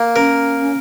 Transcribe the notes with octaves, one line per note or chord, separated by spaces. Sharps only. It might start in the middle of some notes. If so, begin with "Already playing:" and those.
Already playing: A#3
C#4 A#4